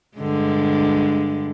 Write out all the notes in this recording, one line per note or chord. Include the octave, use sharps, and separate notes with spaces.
G2 D3 G#3